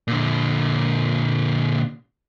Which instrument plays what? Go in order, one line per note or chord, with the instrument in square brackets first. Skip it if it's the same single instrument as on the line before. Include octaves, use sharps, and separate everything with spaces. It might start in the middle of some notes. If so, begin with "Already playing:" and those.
[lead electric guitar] A#2 D3